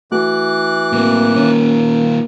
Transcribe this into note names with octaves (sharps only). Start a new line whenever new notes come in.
E3 A3 F#4 D6 F#6
A2 A#3 C4
D#3 C#4 F4